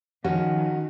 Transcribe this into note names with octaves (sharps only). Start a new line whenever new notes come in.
D#3 F3 C#4 F#4 C#5